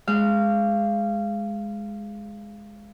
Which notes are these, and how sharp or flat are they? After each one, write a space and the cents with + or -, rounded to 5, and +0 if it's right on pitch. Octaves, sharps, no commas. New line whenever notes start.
G#3 +0 F5 -20